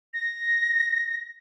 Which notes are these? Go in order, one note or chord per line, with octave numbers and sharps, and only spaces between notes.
A#6